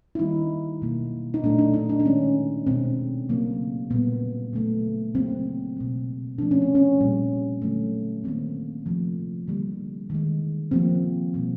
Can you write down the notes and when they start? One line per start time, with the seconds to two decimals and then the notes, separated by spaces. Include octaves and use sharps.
0.15 E4
0.19 D#3 G3 A#3 D#4
0.82 B2 F#3 A#3
1.34 D#4
1.44 A#2 F#3 A3 D4
1.59 D4
1.74 D#4
1.89 D4
2.00 D4
2.05 D#3 G#3 C#4
2.67 B2 G#3 C4
3.29 C#3 F#3 A3 A#3
3.90 A#2 G3 A#3 B3
4.53 C#3 F#3 A3
5.14 C#3 F#3 A#3 C4
5.77 B2 G#3
6.38 C3 F3 A3 D4
6.51 C#4
6.62 C4
6.75 C#4
7.00 A#2 G3 A#3
7.62 D3 F#3 A3
8.24 D#3 F#3 A#3 C4
8.86 C3 F3 A3
9.48 D3 G3 A#3
10.10 D#3 G#3
10.71 C3 F3 A#3 C4
11.34 B2 G3 A#3